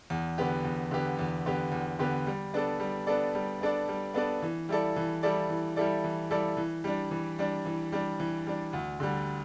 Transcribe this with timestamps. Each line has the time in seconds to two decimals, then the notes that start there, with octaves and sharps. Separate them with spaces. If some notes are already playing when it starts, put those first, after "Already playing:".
0.10 E2
0.38 D3 B3 G4
0.65 E2
0.91 D3 B3 G4
1.19 E2
1.46 D3 B3 G4
1.72 E2
1.99 D3 B3 G4
2.27 G3
2.54 B3 D4 A4 D5
2.80 G3
3.07 B3 D4 A4 D5
3.35 G3
3.61 B3 D4 A4 D5
3.89 G3
4.14 B3 D4 A4 D5
4.42 E3
4.69 G3 E4 A4 D5
4.96 E3
5.23 G3 E4 A4 D5
5.49 E3
5.76 G3 E4 A4 D5
6.04 E3
6.31 G3 E4 A4 D5
6.57 E3
6.84 G3 D4
7.11 E3
7.39 G3 D4
7.65 E3
7.92 G3 D4
8.20 E3
8.47 G3 D4
8.73 D2
9.00 D3 G3